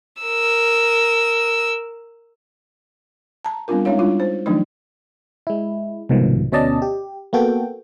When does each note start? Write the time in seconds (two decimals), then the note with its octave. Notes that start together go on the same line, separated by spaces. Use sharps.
0.23 A#4 E6
3.45 A5 A#5
3.68 G3 B3 C4 D4 F4 A#4
3.85 G#3 C#4 D#4 C#5 F5
3.99 G3 D4 E4 F4
4.20 C5
4.46 D#3 F3 F#3 A3 D4 D#4
5.47 G#3 E4
6.09 C2 G#2 B2 D#3 F3
6.52 D2 B2 C#4 D5 D#5 A5
6.82 G4
7.33 A#3 B3 F#4 A4 G5